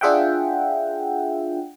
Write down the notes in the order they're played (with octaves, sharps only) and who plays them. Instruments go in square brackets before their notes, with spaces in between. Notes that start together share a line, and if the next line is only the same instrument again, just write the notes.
[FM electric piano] D4 F4 G#4 E5 F#5 G5